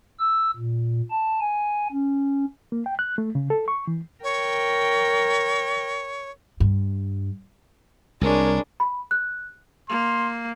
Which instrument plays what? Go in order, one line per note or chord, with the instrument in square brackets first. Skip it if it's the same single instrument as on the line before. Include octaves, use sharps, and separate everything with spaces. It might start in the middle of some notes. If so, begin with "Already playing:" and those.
[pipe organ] E6
A#2
A5
G#5
C#4
[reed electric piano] A#3
G5
F#6
A3
C#3
A4
C#6
E3
[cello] A#4 G5 [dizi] C#5
[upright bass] G2
[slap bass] C2 [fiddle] G#3 D4 [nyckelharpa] A#4 C#5
[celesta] B5
F#6
[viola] A#3 [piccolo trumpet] C6